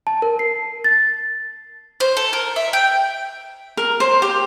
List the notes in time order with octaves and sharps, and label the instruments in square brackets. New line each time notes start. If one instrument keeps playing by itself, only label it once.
[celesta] A5
A#4
C7
A6
[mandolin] C5
A4
A#4
E5
G5
[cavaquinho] A#4
C5
G4